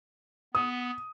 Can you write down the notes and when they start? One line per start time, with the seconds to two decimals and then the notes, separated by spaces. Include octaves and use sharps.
0.55 B3 D#6